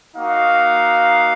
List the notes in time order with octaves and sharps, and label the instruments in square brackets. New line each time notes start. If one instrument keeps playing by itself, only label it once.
[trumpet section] A#3 D#4 F#4 F5